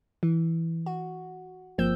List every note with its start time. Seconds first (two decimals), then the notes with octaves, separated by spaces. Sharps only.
0.23 E3
0.86 F#4
1.78 G1 F3 A#3 C4 E6 G6